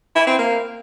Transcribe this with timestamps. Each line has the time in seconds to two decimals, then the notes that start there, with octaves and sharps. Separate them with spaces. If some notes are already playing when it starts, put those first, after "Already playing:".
0.16 E4
0.27 C4
0.39 A#3